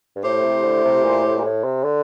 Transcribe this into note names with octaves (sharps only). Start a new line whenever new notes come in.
G2
A2 A3 E4 G4 C5
C3
D3
C3
A#2
A2
A#2
A2
C3
D3